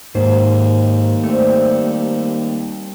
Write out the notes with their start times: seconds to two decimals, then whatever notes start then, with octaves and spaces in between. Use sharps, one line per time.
0.15 D#2 G#2 C5 D#5
1.24 G3 A3 C4